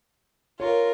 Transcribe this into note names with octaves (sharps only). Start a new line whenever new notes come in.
F4 A#4 C#5